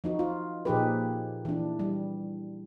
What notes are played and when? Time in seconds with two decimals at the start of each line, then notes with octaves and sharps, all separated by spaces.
0.04 F3 D#4 F#4
0.19 F4
0.65 A#2 F3 D#4 G4 G#4 B4
1.45 E3 D4
1.79 G3